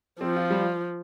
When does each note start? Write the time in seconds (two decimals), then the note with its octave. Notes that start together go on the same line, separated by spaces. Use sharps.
0.21 F3 C4
0.36 F4
0.50 G3